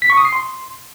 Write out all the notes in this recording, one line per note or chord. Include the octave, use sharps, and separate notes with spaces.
B6
C#6
D#6
C7
C6